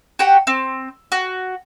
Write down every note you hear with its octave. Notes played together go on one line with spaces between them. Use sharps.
F#4 G4 F#5 G5
C4
F#4